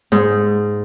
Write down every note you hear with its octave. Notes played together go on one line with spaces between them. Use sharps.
G#2